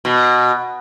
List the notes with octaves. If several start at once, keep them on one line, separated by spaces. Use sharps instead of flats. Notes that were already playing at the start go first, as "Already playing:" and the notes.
B2